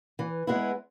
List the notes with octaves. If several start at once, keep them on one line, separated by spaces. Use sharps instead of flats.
E3
G#3 B3 E4